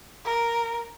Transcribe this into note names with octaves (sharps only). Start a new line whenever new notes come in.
A#4